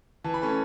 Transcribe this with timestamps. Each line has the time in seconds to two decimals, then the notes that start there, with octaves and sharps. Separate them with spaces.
0.24 E3 A5
0.34 B5
0.42 A3 C#4 A5